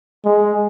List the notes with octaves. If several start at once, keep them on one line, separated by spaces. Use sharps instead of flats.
G#3